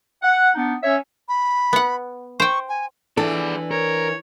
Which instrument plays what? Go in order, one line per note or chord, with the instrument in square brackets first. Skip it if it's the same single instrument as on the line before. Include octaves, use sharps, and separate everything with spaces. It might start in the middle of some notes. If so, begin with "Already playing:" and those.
[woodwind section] F#5
B3 D4 D#4
C#4 C#5 E5
[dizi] B5
[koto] B3 F#5
[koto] C5 G5 [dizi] C#6
[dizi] G#5
[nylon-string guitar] E3 [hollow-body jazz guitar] D4 A4 [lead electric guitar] G#4 D5
[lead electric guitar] A#4 [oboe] C#5